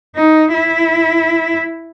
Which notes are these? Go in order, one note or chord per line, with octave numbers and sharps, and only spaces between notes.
D#4
E4